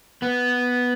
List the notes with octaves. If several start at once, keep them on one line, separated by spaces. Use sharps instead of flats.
B3